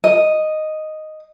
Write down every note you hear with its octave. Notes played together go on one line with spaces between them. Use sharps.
D#5